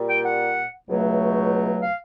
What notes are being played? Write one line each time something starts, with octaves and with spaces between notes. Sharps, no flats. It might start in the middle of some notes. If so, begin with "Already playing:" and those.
Already playing: A#2 G3
G5
F#5
C#2 B2 F#3 A3
F5